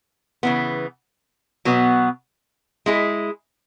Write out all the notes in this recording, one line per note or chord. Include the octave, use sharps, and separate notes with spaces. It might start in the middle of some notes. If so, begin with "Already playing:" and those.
C#3 E3 B3
B2 F#3 B3
G#3 E4 G#4